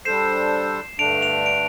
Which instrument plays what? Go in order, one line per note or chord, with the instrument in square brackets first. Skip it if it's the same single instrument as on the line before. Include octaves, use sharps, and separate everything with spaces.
[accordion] G3 D4 A4 C5 [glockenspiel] C7 E7
[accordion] G2 D3 A3 D4 [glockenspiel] D7 F7
[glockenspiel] D7 F7
D7 F7